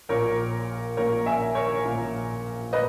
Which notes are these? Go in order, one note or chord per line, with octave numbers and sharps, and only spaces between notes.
A#1 A#2 A#3 A#4 C#5
A#1 A#2 A#3 A#4 C#5
E5 G#5
A#4 C#5
A#1 A#2 A#3
A#3 B4 D#5